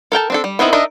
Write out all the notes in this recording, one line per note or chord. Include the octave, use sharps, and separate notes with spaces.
A4 A#4 G5 A5
C4 D4 A4
G3
B3 C4 D#4 E4 A#4
D4 D#4 A#4 D#5 E5